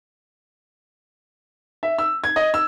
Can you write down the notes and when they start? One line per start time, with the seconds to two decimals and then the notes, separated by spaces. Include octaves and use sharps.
1.83 E5
1.98 E6
2.24 G#6
2.36 D#5
2.54 E6